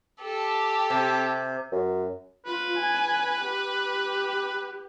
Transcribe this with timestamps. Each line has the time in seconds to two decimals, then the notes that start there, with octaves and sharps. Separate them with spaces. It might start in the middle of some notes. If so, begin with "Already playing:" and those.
0.22 G4 A4
0.90 C3
1.72 F#2
2.46 F4 B4
2.78 G#5
3.42 G4